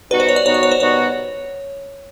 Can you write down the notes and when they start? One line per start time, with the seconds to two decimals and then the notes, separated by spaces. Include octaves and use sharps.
0.10 B2 G3 B3 D#4 F#4 B4
0.20 C5
0.29 C#5
0.36 D5
0.45 B2 G3 B3 D#4 F#4 C#5
0.54 D5
0.63 C#5
0.71 C5
0.80 B2 G3 B3 D#4 F#4 C#5